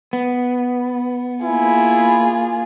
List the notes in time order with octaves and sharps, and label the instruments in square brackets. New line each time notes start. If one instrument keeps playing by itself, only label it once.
[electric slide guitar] B3
[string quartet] A#3 F4 G#4 [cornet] E4